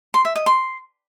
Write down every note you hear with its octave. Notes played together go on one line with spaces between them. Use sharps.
C6
E5
D#5
C6